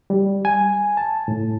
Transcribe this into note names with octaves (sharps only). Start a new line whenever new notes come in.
G3
G#5
A5
A2